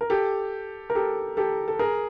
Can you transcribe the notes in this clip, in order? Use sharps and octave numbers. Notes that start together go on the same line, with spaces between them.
A#4
G4 A4
A#4
G4 A4
G4 A4
A4
G#4 A#4